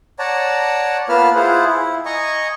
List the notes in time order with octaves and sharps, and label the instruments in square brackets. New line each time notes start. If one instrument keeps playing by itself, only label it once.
[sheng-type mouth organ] C#5 D5 F#5 A5 A#5
A#3 B3 F4 B4 A5 F6
E4 F4 G#4 C5 F#5
E4
D#5 G#5 A#5 C#6